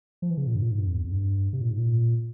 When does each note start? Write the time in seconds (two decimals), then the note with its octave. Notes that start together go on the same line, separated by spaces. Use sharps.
0.22 F3
0.30 E3
0.38 C#3
0.47 A#2
0.55 G2
0.62 A#2
0.71 G#2
0.79 G2
0.87 F2
0.95 E2
1.04 F2
1.12 G2
1.53 C3
1.61 A#2
1.71 G#2
1.79 A#2